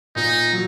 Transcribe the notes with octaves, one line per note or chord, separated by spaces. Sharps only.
A#2 D#4
F#3